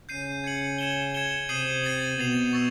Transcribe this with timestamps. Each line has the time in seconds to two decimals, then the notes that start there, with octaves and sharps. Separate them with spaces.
0.09 C#3 C#4 G6 C7 D#7
0.44 G#6 C#7 F#7
0.78 G#6 C#7 E7 G7
1.14 G#6 C#7 E7 G7
1.48 C3 C4 D#6 G6 C7 D#7 F#7
1.84 A6 C7 D#7 F#7
2.18 B2 B3 A6 C7 F7
2.53 C#6 E6 A6